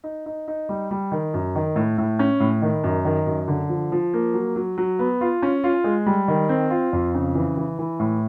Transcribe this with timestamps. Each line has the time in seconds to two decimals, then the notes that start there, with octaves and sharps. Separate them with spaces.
0.04 D#4
0.26 D#4
0.48 D#4
0.69 G3
0.91 G3
1.12 D#3
1.34 F#2
1.55 D#3
1.76 A2
1.98 A2
2.19 C#4
2.40 A2
2.62 D#3
2.84 F#2
3.05 D#3
3.26 F#2
3.48 D3
3.69 F3
3.92 F3
4.13 A#3
4.34 F#3
4.56 F#3
4.78 F#3
4.99 B3
5.21 F4
5.42 C#4
5.64 F4
5.84 G#3
6.06 G3
6.28 D#3
6.49 C4
6.70 F4
6.93 F2
7.14 C#3
7.35 E3
7.57 E3
7.79 E3
8.00 A2